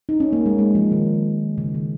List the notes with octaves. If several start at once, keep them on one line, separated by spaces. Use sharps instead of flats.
D#4
C#4
A#3
G#3
G#3
F3
D#3
C#3
D#3